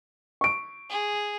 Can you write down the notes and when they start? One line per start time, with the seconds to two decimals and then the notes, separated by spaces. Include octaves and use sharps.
0.41 C#6 D7
0.90 G#4